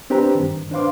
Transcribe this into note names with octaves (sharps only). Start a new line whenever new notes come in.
C4 D4 G4 B4 C5 A#5
G2 D#3
D4 B4 C5 F5 C6 D6